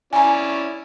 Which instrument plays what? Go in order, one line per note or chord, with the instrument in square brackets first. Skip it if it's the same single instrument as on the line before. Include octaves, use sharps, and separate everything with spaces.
[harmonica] C#4 E4 D5 [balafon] G#5 A#5